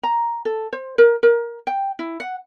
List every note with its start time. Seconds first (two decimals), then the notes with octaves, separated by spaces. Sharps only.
0.03 A#5
0.45 A4
0.73 C5
0.98 A#4
1.23 A#4
1.67 G5
1.99 E4
2.20 F#5